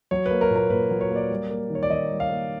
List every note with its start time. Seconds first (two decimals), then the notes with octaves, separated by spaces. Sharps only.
0.11 F#3 C#5
0.26 A#3 B4
0.41 A#4
0.51 A#2
0.56 A#4
0.70 A#2 B4
0.91 F#3
1.01 C#5
1.10 A#3
1.16 D5
1.30 G3
1.50 A#3
1.70 D#3
1.75 C#5
1.83 D5
1.90 D#3 D#5
2.10 G3
2.20 F5
2.29 A#3